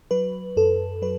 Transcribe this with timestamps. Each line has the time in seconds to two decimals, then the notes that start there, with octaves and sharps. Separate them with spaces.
0.11 F#3 B4
0.56 F#2 A4
1.02 F#3 B4